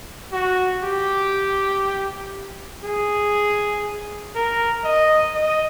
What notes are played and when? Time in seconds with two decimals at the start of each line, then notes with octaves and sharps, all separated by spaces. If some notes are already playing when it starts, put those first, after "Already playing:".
0.32 F#4
0.83 G4
2.84 G#4
4.35 A#4
4.84 D#5
5.35 D#5